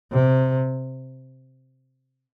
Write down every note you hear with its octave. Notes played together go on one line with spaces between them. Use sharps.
C3